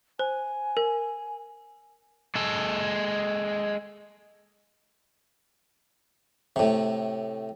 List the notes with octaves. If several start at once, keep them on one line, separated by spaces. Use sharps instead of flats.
C5 G#5
A#4
G#3 A4
A2 C3